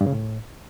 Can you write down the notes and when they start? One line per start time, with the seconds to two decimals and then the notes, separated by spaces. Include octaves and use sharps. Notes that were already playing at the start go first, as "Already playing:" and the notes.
0.01 G2
0.06 C#3
0.12 A2